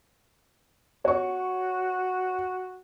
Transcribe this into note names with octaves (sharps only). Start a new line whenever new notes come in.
F#4 C#5 C#6